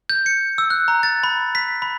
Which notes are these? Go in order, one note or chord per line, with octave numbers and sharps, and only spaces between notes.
G6
C#7
E6
F#6
A#5
A6
B5
B6
B5